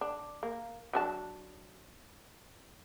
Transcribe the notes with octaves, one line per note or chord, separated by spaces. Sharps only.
D4
A#3
F#3 D4 A5